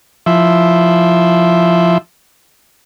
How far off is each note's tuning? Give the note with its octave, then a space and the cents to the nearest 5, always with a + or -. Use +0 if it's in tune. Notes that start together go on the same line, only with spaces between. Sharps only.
F3 +0 E4 +0 E5 +0